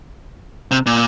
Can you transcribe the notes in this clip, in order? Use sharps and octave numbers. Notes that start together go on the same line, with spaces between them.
C3
A#2